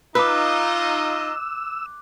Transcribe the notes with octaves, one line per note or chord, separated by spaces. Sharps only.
D#4 F4 B4 D#5 D6 E6 F#6